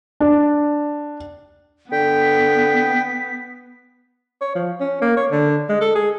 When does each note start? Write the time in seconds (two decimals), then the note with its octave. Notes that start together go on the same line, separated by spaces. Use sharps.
0.20 D4
1.92 D3 B3 G5 B6
4.41 C#5
4.55 F3
4.80 C#4
5.02 A#3
5.17 C#5
5.31 D3
5.69 G#3
5.81 A4
5.95 G#4